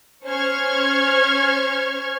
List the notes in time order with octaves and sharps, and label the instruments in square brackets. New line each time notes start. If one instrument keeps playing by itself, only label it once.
[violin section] C#4 C5 C#6 F6 G#6